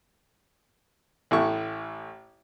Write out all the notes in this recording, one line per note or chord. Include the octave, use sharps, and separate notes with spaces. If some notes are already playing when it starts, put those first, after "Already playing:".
A1 A2 A3 C#6